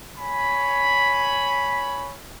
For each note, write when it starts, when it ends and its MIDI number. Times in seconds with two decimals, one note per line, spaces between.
0.18 2.15 73
0.18 2.15 80
0.18 2.15 83